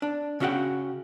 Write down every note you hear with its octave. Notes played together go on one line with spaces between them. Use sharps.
D4
C#3 C#4 F#4 E5 F#5 G5